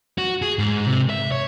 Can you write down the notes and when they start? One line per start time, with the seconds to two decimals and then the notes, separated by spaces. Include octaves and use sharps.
0.18 F#4
0.42 G#4
0.59 G#2
0.86 C3
1.10 E5
1.32 C#5